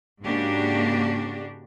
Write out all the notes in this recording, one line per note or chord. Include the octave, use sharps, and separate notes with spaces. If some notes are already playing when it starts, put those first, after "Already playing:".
G#2 C#3 A#3 D4 F#4 G4